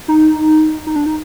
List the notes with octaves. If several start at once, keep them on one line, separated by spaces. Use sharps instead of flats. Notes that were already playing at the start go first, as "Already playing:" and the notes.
D#4
D#4
D4
D#4